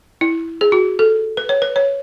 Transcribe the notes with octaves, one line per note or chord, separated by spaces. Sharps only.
E4
G#4
F#4
A4
B4
C#5
B4
C#5